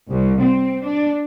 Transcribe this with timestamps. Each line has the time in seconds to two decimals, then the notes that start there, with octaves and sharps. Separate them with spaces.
0.12 C2
0.42 C4
0.85 D4